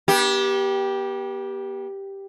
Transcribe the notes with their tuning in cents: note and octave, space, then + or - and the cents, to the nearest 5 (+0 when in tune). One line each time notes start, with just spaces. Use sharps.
B3 -40 G4 +0